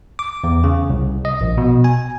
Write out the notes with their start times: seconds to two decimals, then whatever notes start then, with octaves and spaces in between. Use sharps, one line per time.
0.19 D6
0.44 E2
0.64 C#3
0.90 C2
1.25 D#5
1.41 A#1
1.58 B2
1.84 G#5